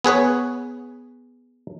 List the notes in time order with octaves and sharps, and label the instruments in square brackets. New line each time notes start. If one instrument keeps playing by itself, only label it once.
[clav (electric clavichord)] B3 G#4 B4 C#5